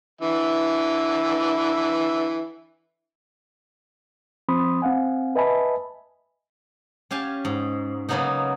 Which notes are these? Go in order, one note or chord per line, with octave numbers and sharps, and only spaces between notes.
D3 E3 E5
F3 C4 B5 C6 D#6
C4 F5 F#5 G#5
B4 D#5 E5 G#5 A5 B5
C#4 G4 F5 G#5 A5
G#2
C#3 F#3 A#3 B3 C#4 D#4